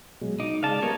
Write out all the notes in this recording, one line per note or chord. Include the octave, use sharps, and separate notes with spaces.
B2 F#3 G#3
D#4 D6
C#3 G#3 D5 F5 A5
G3 A#3 B3 D#4 A#4 C#5